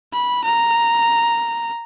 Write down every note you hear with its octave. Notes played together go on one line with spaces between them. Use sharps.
B5
A#5